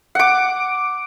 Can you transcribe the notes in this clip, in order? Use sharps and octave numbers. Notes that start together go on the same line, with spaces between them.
F#5 D6